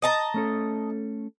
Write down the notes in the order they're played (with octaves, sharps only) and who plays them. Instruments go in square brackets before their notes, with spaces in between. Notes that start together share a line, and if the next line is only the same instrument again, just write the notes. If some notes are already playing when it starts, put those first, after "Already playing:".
[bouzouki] D#5 A5 A#5
[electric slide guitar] A3 C#4 A4